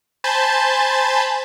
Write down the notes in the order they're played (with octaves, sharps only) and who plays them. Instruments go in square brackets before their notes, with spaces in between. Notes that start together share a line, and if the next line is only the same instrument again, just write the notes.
[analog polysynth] C5 G#5 A5 B5 G6 A6